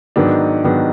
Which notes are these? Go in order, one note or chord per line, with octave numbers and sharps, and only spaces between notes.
G#2 D#3 F#3 B3 D4
G#2 D#3 F#3 B3 D4